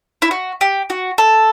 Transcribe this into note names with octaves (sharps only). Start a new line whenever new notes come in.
E4
F#4
G4
F#4
A4